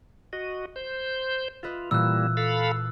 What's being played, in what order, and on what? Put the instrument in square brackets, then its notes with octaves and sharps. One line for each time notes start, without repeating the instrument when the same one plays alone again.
[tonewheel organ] F#4 D#5
C5 G6
[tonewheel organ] F4 [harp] B4 D#5 E5
[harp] A#2 E3 [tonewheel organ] G3 A#3 E4 [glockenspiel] E6 F#6
[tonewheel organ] A4 F5 B5